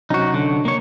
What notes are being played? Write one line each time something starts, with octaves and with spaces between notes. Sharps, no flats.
C3 F#3 C#4 D#4 F#4
D3
A#3 C#5